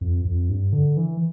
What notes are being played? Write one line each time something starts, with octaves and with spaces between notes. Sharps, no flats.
F2
F2
G2
D3
E3